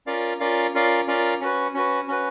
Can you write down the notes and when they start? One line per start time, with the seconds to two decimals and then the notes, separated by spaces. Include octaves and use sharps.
0.06 C#4 F4 A#4 D5 F5
0.40 C#4 F4 A#4 D5 F5
0.74 C#4 F4 A#4 D5 F5
1.07 C#4 F4 A#4 D5 F5
1.41 C#4 F#4 B4
1.74 C#4 F#4 B4
2.08 C#4 F#4 B4